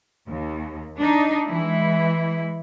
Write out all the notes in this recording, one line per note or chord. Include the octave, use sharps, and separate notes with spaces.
D#2
D4 D#4
E3 G#3 E4